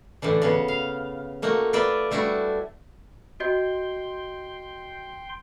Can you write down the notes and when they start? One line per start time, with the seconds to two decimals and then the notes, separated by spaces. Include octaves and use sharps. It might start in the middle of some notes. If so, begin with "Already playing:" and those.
0.22 A2 D3 E3 D4
0.42 C#3 B3 F#4
0.68 F5
1.42 A3 A#3 D#4 F#4
1.73 F4 B4 D5 E5
2.11 G3 A3 D4 E4 F#4
3.40 F#4 D#5 G5 C6 G6